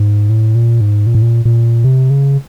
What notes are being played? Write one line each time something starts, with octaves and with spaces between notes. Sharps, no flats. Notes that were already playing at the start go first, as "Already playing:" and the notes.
Already playing: G#2
A2
A#2
G#2
A#2
A2
A#2
A#2
C3
C#3